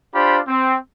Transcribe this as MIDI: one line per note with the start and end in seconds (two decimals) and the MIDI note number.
0.15 0.40 62
0.15 0.40 65
0.15 0.40 67
0.15 0.40 72
0.15 0.40 83
0.48 0.77 60